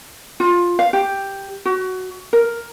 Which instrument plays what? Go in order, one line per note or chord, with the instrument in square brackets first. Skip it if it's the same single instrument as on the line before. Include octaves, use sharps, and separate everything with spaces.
[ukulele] F4
F5
G4
F#4
A#4